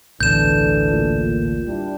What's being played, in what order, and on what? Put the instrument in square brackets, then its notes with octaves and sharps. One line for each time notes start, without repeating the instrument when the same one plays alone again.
[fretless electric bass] A1 D2 B2 [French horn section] E3 D4 A4 [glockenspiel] G6 E7
[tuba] A#2
[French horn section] G3 D4 E4